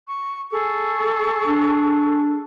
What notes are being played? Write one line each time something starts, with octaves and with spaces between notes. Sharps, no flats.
C#6
G#4 A4 C#6
D4